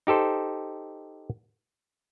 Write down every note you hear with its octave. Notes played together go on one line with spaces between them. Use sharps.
D#4 G4 A4 C5